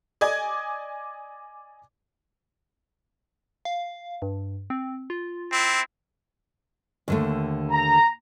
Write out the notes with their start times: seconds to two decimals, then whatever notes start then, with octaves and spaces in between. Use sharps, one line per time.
0.21 D5 D#5 G#5 D6 G#6
3.65 F5
4.22 G2
4.70 C4
5.10 F4
5.51 C4 E4
7.08 D#2 D3 A3
7.70 A#5